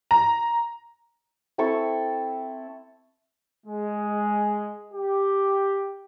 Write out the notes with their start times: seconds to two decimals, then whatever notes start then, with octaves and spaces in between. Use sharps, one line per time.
0.11 A#5
1.58 C4 E4 A4 C#6
3.66 G#3
4.93 G4